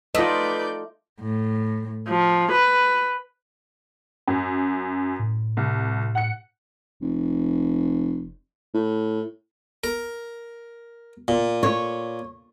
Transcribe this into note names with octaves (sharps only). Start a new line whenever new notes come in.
A3 D#4 F4 B4 D5 D#5 G6
A2
F3
B4
F#2
A2
C2
F#5 C#7
F1
A2
A#4
A#2
C#5